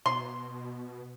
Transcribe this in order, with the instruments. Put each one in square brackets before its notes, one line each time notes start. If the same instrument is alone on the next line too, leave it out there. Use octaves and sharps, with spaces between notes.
[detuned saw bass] B2 [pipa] C6